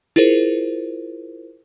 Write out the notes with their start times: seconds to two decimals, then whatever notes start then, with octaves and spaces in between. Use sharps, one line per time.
0.16 E4 F4 G#4 A#4 C5